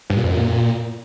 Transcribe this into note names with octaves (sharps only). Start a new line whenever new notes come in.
G2
A#2
F2
F#2
A#2